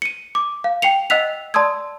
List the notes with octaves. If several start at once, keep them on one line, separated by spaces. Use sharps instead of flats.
C#7 D#7
D6
F5
G5 C7 C#7 F7
D#5 F#5 E6 F#6 B6 F7
D5 A5 C6 D#6 E6 G#6